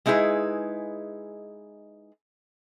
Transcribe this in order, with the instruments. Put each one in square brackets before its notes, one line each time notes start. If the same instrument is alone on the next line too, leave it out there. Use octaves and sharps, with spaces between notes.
[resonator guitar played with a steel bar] G#3 D#4 E4 G#4 B4